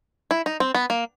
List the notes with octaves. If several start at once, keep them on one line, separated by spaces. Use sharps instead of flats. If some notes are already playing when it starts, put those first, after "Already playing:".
E4
D#4
C4
B3
A#3